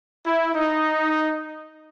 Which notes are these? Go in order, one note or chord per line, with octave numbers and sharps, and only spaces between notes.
E4
D#4